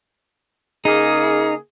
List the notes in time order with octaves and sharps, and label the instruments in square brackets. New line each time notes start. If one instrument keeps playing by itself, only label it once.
[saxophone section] C#3 A#3 G#4 [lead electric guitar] D#4